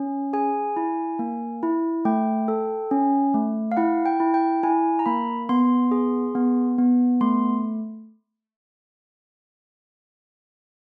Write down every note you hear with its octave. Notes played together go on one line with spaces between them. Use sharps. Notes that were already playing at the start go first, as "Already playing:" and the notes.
Already playing: C#4
G#4 G#5
E4
A#3
E4
A3 G5
A4
C#4
A3
F5
E4 F#5
G5
E4
G5
E4 G#5
A#5
A#3 B5
B3 C6
G#4
B3
B3
A3 C6